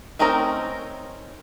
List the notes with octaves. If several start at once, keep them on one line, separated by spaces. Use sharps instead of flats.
A3 C4 C#4 D#4 A#4